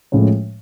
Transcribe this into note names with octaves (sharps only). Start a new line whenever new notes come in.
A2 F3 G#3 C#4